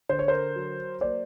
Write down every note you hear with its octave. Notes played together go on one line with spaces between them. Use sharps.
D3 C5
C#5
A#4 C5
F#3
A#3 C5 D5